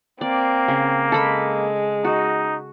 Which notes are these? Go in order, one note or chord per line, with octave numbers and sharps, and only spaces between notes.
A#3 C4 D5
C#3
G#3 A4 B5
D#4 F#4